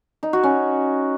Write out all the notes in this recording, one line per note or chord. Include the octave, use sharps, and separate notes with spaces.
D#4
F#4
C#4